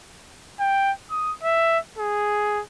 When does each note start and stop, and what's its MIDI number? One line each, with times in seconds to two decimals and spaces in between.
0.60 0.92 79
1.10 1.33 87
1.43 1.79 76
1.98 2.62 68